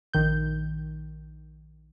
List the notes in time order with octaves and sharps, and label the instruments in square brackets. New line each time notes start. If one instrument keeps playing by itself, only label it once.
[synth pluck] A#1 D#3 G6